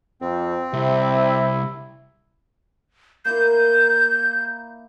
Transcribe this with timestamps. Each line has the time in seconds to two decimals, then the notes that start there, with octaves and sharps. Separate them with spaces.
0.21 F2 C4
0.74 C2 C3 E4
3.25 A#3 D#4 E4 G6